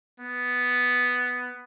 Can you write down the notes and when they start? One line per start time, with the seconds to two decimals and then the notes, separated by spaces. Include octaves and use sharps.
0.20 B3